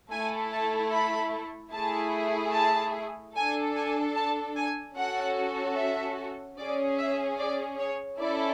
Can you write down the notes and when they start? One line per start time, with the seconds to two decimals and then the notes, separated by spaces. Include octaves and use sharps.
0.12 A3 E4 A4 G#5
0.52 A5
0.92 B5
1.73 A3 E4 G#4 A5
2.54 A5
3.35 D4 A4 G#5
3.76 G#5
4.15 A5
4.56 G#5
4.97 C#4 F#4 A4 F#5
5.77 E5
6.58 C#4 G#4 D5
6.98 E5
7.39 D5
7.79 C#5
8.19 C#4 E4 A4 D5